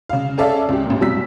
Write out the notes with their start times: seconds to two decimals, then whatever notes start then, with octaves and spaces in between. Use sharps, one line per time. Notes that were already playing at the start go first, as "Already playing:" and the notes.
0.09 C#3 F5
0.38 C#4 G#4 A4 D5 E5 F5
0.69 C#2 G4
0.86 A1 A#2
1.00 F1 B2 F#3 G3 E6 B6